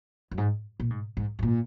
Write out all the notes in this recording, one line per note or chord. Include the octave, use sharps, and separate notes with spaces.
F#2
G#2
A#2
G#2
G#2
G#2
A#2